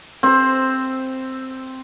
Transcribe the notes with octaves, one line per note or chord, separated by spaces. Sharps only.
C4 C5